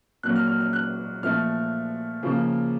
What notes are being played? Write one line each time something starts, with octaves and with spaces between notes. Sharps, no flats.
A#2 F#3 A#3 F#6
F6
F6
F6
F#6
A#2 F3 A3 F6
C#3 F3 A#3